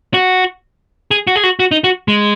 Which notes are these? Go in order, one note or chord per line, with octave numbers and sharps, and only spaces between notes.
F#4
G#4
F#4
G#4
F#4
F#4
D#4
F#4
G#3